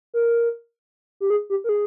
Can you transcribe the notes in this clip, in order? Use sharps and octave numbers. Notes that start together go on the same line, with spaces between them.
A#4
G4
G#4
G4
A#4
G#4